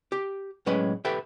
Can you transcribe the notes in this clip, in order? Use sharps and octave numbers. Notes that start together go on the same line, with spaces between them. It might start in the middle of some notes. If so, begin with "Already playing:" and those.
G4
A2 F#3 G#3 C#4 B4 G5
G4 A4 B4 E5 G5